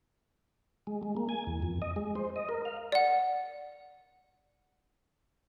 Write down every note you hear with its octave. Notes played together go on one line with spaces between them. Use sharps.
G#3
G#3
A#3
G#5
E2
F2
D#5
G#3
C5
D#5
A#4
F5
D5 F#5